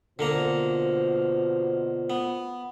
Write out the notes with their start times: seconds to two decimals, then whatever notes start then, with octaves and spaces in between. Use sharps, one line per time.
0.19 B2 D3 A#3 F4 C5 A#5
2.10 B3